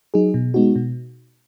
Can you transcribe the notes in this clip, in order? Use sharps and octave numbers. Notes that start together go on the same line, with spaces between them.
F#3 D#4 G#4
B2
G#3 B3 D#4 F#4
B2